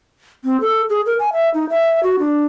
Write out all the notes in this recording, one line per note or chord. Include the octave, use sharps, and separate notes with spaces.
C4
A4
G#4
A#4
G#5
E5
D#4
E5
F#4
D4